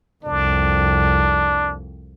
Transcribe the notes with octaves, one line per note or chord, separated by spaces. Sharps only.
C2 F2 D4